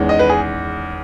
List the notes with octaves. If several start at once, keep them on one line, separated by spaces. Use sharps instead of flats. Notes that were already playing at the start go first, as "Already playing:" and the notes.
Already playing: E2 D#3 G#3 C#4
D#5
B4
G#4